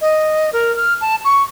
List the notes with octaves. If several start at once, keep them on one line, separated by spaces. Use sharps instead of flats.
D#5
A#4
F6
A5
C#6